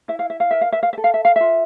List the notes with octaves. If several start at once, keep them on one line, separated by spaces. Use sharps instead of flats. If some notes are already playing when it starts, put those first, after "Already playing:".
E4 E5
F5
E5
F5
A#4 E5
F5
E5
F5
E5
A4
F5
E5
F5
F4 E5